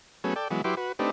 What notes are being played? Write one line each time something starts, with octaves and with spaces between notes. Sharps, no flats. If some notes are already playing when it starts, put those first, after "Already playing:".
F#3 A3 B3 C#4 G#4
A4 D5 G5
E3 F#3 G#3 B3
F#3 E4 G4 B4 C6 D6
F#4 B4
A3 C4 D4 D#4 G4 B4